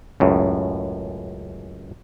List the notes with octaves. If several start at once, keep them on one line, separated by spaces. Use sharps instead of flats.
C#2 F#2 A2